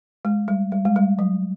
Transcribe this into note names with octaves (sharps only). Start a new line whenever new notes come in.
G#3
G3
G3
G#3
G3
F#3